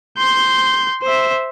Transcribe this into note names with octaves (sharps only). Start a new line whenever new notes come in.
C6 G6
C5 E5